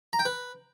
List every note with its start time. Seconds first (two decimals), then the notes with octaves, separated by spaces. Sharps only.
0.13 A#5
0.19 G5
0.25 B4